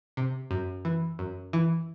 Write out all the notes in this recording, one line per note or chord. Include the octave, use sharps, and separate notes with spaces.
C3
F#2
E3
F#2
E3